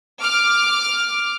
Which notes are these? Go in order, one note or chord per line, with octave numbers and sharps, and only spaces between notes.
D6 F6